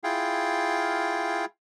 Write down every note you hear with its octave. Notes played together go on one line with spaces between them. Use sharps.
E4 F4 G#4 F5 G5